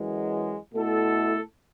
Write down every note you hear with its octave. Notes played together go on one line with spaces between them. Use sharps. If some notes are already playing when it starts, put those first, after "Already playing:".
Already playing: F#2 E3 G#3
B2 A3 E4 A4